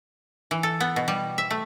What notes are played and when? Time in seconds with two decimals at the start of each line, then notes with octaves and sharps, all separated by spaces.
0.51 E3
0.63 A4
0.80 B3
0.96 B2
1.08 G3
1.38 E5
1.51 A3